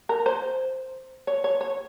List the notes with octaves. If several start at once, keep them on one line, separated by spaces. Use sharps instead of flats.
A#4
C5
C#5
C#5
C#5